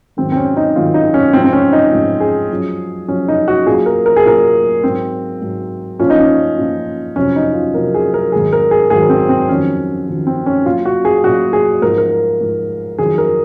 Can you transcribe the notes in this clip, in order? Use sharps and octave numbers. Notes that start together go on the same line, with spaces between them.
G#2 D#3 F#3 C4
C4
C#4
D#4
G#2 D#3 F#3 F4
D#4
C#4
G#2 F3 C4
C4
C#4
D#4
G#2 F3
G#4
F#2 F3
F#2 F3 C#4
D#4
F#4
A#2 F#3 G#4
A#4
A#4
G#4
A#2 F#3 A#4
G#2 F#3 C4
G#2 F#3
A#2 F3 C#4
D#4
C#4
A#2 F3
F2 C3 F#3 C#4
D#4
F4
F2 C3 F#3 A#4
G#4
A#4
G#2 D#3 F#3 G#4
A#4
G#4
G#2 D#3 F#3 G#4
C4
C4
F2 D#3 F#3 C#4
F2 D#3 F#3
C4
C#4
A#2 F#3 F4
F#4
G#4
A#2 F#3 F#4
G#4
G#2 F3 A#4
A#4
G#2 F3
F2 D#3 F#3 G#4
A#4